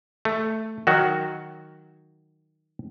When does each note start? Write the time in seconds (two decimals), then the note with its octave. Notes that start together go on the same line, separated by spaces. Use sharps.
0.25 A3
0.87 D#3 F#3 F#4